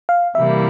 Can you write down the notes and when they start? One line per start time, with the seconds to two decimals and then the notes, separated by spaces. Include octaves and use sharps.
0.09 F5
0.35 C3 E3 G3 A#3 E4 E5